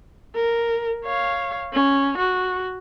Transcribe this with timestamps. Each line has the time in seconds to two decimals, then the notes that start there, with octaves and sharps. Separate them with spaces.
0.35 A#4
1.05 C#5 F5
1.73 C#4
2.17 F#4